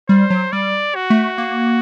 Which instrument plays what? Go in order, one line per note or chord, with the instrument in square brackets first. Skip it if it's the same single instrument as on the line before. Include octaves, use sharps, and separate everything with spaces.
[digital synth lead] G3 [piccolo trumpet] C5
[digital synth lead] F#3
[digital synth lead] G3 [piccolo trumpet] D5
[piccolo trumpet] F#4
[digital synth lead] A3
A#3